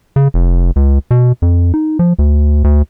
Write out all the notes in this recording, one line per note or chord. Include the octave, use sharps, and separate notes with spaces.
C#3
F1
C#2
B2
F2
D#4
F3
D2
D2